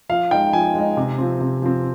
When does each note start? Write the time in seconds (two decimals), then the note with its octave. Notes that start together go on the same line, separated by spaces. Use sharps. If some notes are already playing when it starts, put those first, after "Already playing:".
0.09 F3 F5
0.31 G#3 D#4 G5
0.53 F3 G#5
0.75 G#3 D#4
0.97 C3
1.18 F3 C4
1.41 C3
1.62 F3 C4